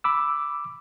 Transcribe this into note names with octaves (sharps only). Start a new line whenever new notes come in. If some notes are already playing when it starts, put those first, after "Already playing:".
B5 D6 E6